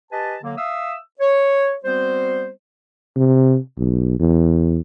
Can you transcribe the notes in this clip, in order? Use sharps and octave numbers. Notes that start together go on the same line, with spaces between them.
G4 B4 D#5 G#5 A5
D3 F#3 A#3
E5 F5 D#6 E6
C#5
G3 B3 C4 F#4 C5
C3
B1
E2